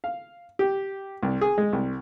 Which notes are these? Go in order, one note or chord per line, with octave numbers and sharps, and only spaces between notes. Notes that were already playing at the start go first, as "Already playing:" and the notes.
F5
G4
C2
G#4
G#3
C2